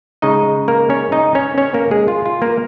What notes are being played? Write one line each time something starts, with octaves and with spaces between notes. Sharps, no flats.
C#3 G#3 D#4 D#5
A#3 A#4
C#4 C#5
D#4 D#5
C#4 C#5
C#4 C#5
A#3 A#4
G#3 G#4
F4
F4
A#3 A#4